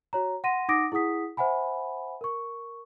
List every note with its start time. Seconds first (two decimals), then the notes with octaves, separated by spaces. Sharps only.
0.13 F#4 C#5 A#5
0.44 F#5 C6 A#6 D#7
0.69 D#4 F#5 D6 D#6 A#6 D7
0.92 E4 G#4 F#5 D#6 B6
1.37 C5 E5 F#5 G#5 B5
2.21 A#4 C#6